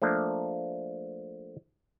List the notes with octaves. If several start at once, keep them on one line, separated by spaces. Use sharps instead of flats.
F3 A3 A#3 D4